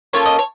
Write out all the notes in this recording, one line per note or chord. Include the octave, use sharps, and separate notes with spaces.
A#3 C#4 F4 A4 C#5
D#5
C#5